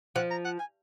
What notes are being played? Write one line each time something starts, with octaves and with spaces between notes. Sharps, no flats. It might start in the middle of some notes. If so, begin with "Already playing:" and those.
F3 F#5
A#5
F#5
G#5